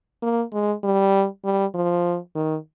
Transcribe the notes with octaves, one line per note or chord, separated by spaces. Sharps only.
A#3
G#3
G3
G3
F3
D#3